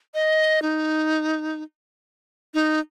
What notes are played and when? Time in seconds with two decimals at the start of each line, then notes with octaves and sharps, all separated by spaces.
0.14 D#5
0.62 D#4
2.54 D#4